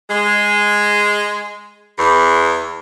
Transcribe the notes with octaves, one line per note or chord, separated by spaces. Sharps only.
G#3
E2